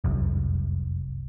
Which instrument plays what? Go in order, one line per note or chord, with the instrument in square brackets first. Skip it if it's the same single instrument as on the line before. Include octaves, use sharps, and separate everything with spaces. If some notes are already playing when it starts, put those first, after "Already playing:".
[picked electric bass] F1 C2 F#2